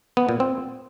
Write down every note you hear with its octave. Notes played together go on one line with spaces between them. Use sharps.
B3
A#2
C4